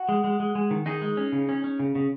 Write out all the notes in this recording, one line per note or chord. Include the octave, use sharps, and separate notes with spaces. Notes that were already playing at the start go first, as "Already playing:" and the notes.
Already playing: F#4
G#3
G#3
G#3
G#3
D#3
D#3 D#4 G#4
G#3
C#4
C#3
C#4
C#4
C#3
C#3